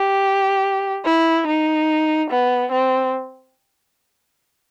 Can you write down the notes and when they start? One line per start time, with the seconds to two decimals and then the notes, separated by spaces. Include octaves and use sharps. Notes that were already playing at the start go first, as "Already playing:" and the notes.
Already playing: G4
1.05 E4
1.47 D#4
2.30 B3
2.72 C4